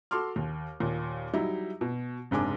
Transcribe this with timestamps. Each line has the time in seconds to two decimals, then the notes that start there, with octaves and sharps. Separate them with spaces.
0.11 F#4 A4 C6 D6 F6
0.36 D#2
0.80 D#2 A#2
1.33 F#3 G3 D#4 E4
1.81 B2
2.31 F#1 G#2 C3 D4 G#5 D6